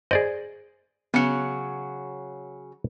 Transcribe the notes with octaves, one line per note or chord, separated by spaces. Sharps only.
G#4 C5 D5 D#5
C#3 F#3 B3 C#7